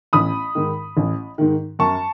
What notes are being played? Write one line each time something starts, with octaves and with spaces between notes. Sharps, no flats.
A1 B5 D#6
G#2 D#3
A1
G#2 D#3
F#2 A5 C#6